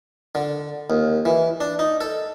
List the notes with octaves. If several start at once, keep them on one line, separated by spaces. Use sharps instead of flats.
D3
D#2
E3
D4
D#4
A4